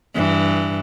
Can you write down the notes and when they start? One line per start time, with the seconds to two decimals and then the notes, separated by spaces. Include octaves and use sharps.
0.15 G2 E3